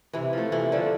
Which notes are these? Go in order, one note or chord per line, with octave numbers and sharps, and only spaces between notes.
C3 E3 E4
F3 A3
C3 E3 E4
D3 F3 A3 D4